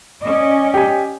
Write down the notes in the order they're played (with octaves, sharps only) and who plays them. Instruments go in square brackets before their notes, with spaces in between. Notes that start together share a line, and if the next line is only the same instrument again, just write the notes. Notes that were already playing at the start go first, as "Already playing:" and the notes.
[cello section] C#4 D5 D#5
[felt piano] G4 G#5